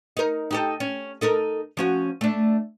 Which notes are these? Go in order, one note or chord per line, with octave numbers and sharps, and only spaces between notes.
D#4 A#4
D#4 G4 A4
C#4
D#4 A4 A#4
F3 C#4 F#4
A3 D4